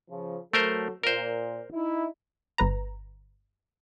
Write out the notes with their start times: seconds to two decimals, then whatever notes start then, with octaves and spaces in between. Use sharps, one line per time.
0.10 C#3 F3
0.53 F#3 A3 A4 A#4 C5
1.03 A#2 A#4 C5
1.73 D#4 E4
2.58 G1 B4 A#5